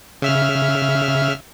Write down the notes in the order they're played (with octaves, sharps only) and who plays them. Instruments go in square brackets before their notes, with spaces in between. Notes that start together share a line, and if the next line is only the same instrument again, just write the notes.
[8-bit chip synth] C#3 E5 F6